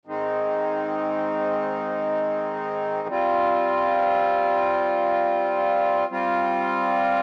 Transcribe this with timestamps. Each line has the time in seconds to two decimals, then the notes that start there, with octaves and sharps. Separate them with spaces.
0.05 G#2 D#3 G#3 C4 D#4
3.08 G3 C4 F4
6.10 G3 C4 F4